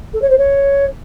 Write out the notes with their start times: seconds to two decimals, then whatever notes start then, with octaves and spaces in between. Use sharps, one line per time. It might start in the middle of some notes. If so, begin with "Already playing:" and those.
0.13 A4
0.22 C#5
0.30 C5
0.38 C#5